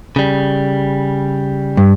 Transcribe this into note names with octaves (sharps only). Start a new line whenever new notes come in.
C#3 G3
G2